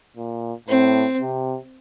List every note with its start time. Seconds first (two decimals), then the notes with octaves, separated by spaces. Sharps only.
0.16 A#2
0.68 A2 C4
1.21 C3